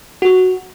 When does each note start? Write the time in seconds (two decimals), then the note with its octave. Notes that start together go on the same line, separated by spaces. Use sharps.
0.22 F#4